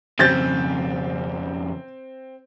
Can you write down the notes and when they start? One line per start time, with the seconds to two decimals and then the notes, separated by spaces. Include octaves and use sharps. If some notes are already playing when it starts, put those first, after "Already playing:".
0.19 F2 C#3 C4 G6 A6